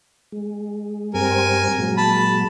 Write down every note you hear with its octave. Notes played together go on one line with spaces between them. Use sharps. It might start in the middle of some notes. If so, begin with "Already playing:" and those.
G#3
G2 G3 C4 A#4 G#5
A#2 F#3 G#3
A5 B5